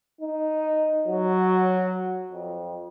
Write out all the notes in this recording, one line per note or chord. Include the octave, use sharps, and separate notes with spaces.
D#4
F#3
F2